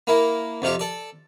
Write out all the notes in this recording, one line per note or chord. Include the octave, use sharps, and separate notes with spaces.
A#3 E4
F2 C3 F4 G4
A4 D5